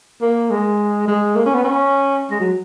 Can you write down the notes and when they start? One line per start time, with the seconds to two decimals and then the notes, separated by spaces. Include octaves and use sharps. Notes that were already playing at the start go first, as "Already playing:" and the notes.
0.22 A#3
0.51 G#3
1.08 G#3
1.36 A#3
1.46 C#4
1.54 B3
1.64 C#4
2.31 G#3
2.40 F#3